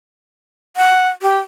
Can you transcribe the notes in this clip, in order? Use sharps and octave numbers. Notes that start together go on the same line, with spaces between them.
F#5
G4